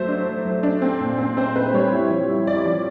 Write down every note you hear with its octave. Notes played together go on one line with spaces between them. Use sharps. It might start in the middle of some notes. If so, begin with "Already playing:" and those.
Already playing: F#3 A3 C5
D4
F#3
F#3
D4
C4
A#2
C4
C4 C5
C4 B4
G3 C#5
E4
F3
E4
E4 D5
F3